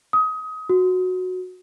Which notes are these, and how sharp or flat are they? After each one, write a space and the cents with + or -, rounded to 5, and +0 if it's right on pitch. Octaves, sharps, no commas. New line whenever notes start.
D#6 +25
F#4 -10